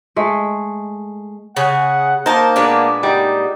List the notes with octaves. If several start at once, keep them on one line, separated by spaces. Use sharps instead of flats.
G#3 A3
C#3 G#4 F#5
A#3 D#4 A#4 C5 A5
A#2 G#3 B3 D4
G3 D#4